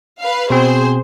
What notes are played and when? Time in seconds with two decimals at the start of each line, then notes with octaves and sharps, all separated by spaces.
0.20 B4 F5
0.50 B2 C4 G#4 C5